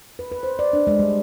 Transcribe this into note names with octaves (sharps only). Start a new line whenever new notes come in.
B4
B4
C5
D5
D4
G#3
G3